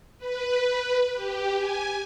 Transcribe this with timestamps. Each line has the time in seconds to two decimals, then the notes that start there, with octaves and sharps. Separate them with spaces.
0.18 B4
1.14 G4
1.56 G#5